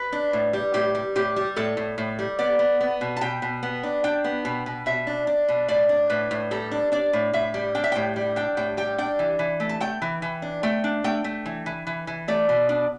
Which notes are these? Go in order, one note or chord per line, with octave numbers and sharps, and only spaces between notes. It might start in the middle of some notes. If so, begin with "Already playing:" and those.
Already playing: B4
D4
A2
G3
A2 G4
G3
A2 G4
G3
A2 A4
A2
A2
G3
B3 D5
B3
B3
B2
A5
B2 G5
B2
B3
D4
D4 G5
B3
B2
B2
B2 E5
D4
D4
B2
A2 D5
D4
A2 B4
A2
G3 A4
D4
D4 D5
A2
A2 E5
G3
D4 G5
E5
A2 G5
G3
D4 G5
A2 G5
G3 G5
D4 G5
E3
E3
A3
A5
A3 G5
E3
E3
D4
A3 G5
D4
A3 G5
A3
E3
E3
E3
E3
A3 D5
B2
D4